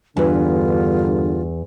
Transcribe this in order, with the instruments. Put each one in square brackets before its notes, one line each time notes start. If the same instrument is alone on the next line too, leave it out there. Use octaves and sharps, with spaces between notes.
[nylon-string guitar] E2 B4 [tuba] G2 [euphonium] D3 [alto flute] F4